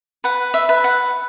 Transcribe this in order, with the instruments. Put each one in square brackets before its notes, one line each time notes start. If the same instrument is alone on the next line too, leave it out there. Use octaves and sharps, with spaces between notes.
[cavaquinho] B4 F#5
E5
B4
F#5